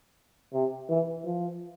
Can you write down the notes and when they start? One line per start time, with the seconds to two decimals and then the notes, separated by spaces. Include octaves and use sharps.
0.53 C3
0.89 E3
1.25 F3